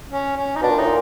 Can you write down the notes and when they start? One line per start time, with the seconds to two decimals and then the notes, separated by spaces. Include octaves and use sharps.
0.11 C#4
0.37 C#4
0.56 D#4
0.62 B2 D4
0.70 A#2
0.78 A2 D#4
0.86 A#2